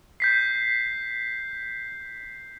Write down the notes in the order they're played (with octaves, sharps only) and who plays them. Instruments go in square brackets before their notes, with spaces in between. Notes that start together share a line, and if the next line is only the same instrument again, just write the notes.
[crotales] G6 B6 C7